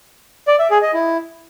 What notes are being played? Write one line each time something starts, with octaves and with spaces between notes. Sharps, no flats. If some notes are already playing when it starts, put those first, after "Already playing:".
D5
E5
G#4
D#5
E4